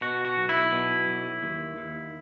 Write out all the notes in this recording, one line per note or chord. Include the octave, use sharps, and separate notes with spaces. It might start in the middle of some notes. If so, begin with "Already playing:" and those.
B2 F#4
F#4
B1
E4
B2
B1
D#2
D#2